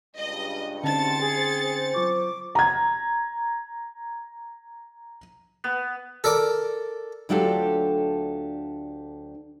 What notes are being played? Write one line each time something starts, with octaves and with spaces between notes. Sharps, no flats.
C#2 G2 D#5
D3 C4 C#4 D#4 A5 A6 C#7
G#4
C5
F#3 F4 C#6 D6
A#5 G#6
B3
A4 A#4 D5 D6
D2 F#3 D4 F4 G4 A4